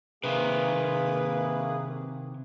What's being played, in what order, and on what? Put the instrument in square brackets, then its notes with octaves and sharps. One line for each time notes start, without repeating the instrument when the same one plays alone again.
[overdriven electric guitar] C3 D#3 [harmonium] A#3 G#4 [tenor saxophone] B4